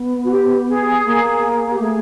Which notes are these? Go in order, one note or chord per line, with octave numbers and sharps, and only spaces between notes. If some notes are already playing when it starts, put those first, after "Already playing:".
Already playing: B3
F#4
G4
G#4
A#3
G4
A3 G#4